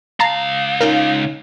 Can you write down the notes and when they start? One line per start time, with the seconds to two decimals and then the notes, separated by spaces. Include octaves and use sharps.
0.20 C#2 F5 A5 A#5 C7
0.81 C#4 D#4 F4 A#4